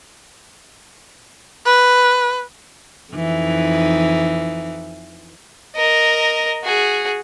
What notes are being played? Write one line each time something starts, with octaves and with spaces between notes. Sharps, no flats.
B4
F2 E3 D#4
A#4 D#5
F#4 G#4